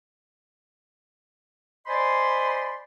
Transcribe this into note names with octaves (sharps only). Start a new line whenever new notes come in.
C5 D5 D#5 G#5 B5 C6